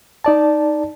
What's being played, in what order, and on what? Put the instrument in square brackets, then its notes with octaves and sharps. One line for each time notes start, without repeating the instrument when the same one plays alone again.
[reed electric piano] D#4 D5 A5